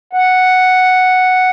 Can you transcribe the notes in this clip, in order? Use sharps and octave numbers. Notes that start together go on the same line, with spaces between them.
F#5